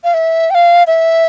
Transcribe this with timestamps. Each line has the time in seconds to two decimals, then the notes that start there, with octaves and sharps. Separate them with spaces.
0.04 F5
0.14 E5
0.50 G5
0.55 F5
0.87 E5